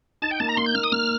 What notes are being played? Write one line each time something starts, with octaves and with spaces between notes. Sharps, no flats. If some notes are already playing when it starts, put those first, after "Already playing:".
D#4 A5
G5
A#3 A5
A#5
A#3 C6
G6
A#3 F6
D#6
A#3 F6